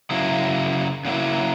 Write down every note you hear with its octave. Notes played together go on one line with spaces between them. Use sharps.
C#3 F#3 A#3 E4
C#3 F#3 A#3 E4